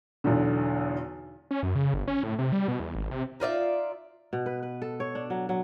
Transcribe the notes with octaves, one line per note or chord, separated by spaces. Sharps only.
B1 E2 D3
C#4
F#2
C#3
G1
C#4
A2
C3
G3
B2
E2
G#1
C3
D#4 F4 D5 E5
B2
B4
B4
A4
C#5
D4
F#3
F#3